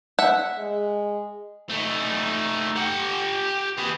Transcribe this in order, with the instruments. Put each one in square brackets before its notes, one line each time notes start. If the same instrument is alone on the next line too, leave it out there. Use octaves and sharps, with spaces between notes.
[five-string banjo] E5 F#5
[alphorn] G#3
[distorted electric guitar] A3 D#4
G4 F#5
G#4 B4